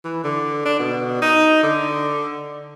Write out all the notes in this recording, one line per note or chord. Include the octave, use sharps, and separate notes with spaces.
E3
D3
D4
B2
D#4
D3